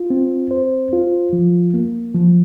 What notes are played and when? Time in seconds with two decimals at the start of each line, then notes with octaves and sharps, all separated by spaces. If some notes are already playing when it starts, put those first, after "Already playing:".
Already playing: F4
0.10 C4
0.51 C5
0.93 F4
1.33 F3
1.74 A#3
2.15 F3